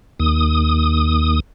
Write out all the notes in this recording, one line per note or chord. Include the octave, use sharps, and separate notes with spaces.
D#2 D#6